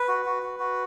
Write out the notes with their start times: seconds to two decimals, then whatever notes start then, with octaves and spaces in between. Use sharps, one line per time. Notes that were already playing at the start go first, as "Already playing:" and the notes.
Already playing: B4
0.08 F#4
0.26 F#4
0.43 F#4
0.60 F#4